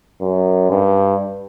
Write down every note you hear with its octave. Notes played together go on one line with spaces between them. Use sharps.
F#2
G2